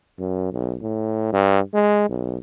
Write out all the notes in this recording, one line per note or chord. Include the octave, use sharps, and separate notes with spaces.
F#2
B1
A2
G2
G#3
B1